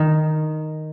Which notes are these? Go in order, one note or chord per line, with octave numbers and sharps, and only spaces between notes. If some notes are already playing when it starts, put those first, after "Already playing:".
Already playing: D#3 D#4